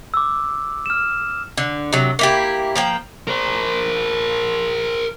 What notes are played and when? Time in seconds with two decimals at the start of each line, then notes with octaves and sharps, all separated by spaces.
0.14 D6 E6
0.86 F6 E7
1.58 D3
1.93 C3 F#3
2.19 A#3 E4 G4
2.76 F3 A#3 G5
3.28 A#4 C5